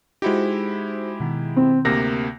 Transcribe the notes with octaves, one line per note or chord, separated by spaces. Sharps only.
G#3 D#4 E4 F#4 G4 C5
B2 D#3
C4
D2 C3 A#3 A#6